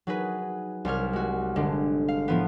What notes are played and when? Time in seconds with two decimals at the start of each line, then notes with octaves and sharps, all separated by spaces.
0.07 F#3 D#4 G#4 B4
0.85 C2 G3 C#5 F6
1.13 G#3 F#4
1.56 G1 D3 G#3
2.08 F5
2.28 A2 F3 B3